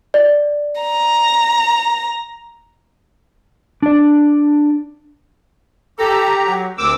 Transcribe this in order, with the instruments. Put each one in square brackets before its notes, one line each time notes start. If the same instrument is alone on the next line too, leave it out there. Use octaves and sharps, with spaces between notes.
[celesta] D5
[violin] A#5
[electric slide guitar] D4 D5
[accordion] G4 A#5 [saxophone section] A4
[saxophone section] F#3
[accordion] D2 D6 E6 [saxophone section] C4 G4 A#4